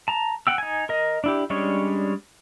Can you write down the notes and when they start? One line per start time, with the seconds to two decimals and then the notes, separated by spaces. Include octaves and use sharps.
0.08 A5 A#5
0.47 F#5 G5 E6
0.58 D#4 G#5
0.89 A#4 D#5
1.24 D4 E4 G4
1.50 G3 G#3 C#4 D4 C#5